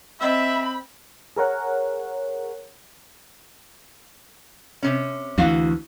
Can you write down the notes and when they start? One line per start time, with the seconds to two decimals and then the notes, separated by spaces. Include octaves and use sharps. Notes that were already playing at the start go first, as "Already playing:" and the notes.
0.21 C4 D#5 E5 B5 E6
1.36 G#4 A#4 C#5 F#5
4.83 C3 C#4
5.38 D2 E3 F#4 F5